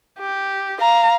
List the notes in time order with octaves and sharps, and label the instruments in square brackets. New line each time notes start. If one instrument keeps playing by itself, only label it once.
[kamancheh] G4
[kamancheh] F5 [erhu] A#5